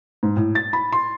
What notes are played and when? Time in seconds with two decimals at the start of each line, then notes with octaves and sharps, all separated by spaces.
0.23 G#2
0.37 A2
0.55 A6
0.73 B5
0.92 C6